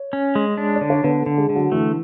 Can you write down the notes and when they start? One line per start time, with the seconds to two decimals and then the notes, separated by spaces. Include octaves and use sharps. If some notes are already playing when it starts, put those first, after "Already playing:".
Already playing: C#5
0.13 C#4
0.35 G#3
0.58 D4
0.76 D5
0.81 D3
0.90 C#5
1.03 D3 B3 B4
1.21 A3 A4
1.26 D3
1.38 G#3 G#4
1.50 D3
1.55 F#3 F#4
1.72 E3 A3 E4